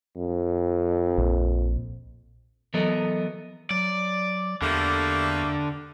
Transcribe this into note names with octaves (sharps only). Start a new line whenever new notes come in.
F2
A#1
E3 F#3 B3 A4 A#4 D#5
F#3 D5
E2 D3 G3 A3 A#3